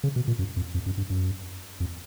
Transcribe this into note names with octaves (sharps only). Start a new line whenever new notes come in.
C#3
B2
A#2
F#2
F2
F2
F#2
G2
F#2
F2